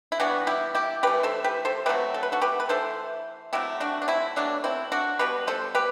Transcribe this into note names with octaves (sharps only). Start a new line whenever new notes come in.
E4
E3 G3 B3 D4 F#4
E4 G4
E4 G4
E3 A3 G4 B4
A4 C5
G4 B4
A4 C5
C3 F#3 A3 G4 B4
A4
B4
F#4 A4
G4 B4
B4
E3 A3 A4 C5
C3 F#3 A3 E4 G4
D4 F#4
D4
C4 E4
B2 F#3 A3 D4
C4 E4
D4 F#4
B2 G3 B3 G4 B4
A4 C5
G4 B4